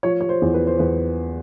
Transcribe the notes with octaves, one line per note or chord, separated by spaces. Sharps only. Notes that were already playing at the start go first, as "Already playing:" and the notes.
F3 C#5
C#5
C5
E2
B4
C5
E2 B4